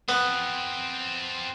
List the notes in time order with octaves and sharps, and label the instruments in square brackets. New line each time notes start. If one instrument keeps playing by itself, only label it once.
[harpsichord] B3 [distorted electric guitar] C4 A4